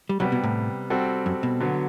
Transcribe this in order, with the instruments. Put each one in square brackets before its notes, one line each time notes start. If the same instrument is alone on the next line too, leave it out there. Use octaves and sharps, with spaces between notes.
[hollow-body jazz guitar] G3
[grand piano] C3 G3 B3 [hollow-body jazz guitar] F#3
[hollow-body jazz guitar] B2
A2
[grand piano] G3 C4 F#4 A4
[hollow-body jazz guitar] F#2
B2
[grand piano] D3 F#3 B3